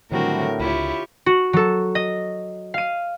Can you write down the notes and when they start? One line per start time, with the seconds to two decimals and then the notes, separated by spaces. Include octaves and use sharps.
0.12 A2 D3 D#3 F#3 G3 C4 F#4 A#4
0.60 C#2 E4 F4 G4 C#5
1.26 F#4
1.53 F#3 A4
1.95 D#5
2.74 F5 D#7